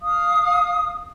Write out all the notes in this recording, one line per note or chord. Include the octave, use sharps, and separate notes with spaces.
F5 D#6